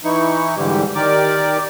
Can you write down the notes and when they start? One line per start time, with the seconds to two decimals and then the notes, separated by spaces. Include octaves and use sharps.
0.04 E3 D#4 E4 C#6
0.57 G#2 D3 E3 G3 G4
0.95 D#3 G4 A#4 D5 D6